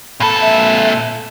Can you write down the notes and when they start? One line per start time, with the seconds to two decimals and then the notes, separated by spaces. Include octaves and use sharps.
0.20 A#2 A4 B5
0.41 E5